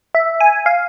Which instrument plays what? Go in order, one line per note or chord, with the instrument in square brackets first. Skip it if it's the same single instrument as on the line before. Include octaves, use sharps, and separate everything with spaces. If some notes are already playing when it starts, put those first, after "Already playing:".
[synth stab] E5
G#5
F5